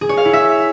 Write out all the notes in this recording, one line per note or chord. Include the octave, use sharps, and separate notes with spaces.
G#4
C#5
F5
E4
E5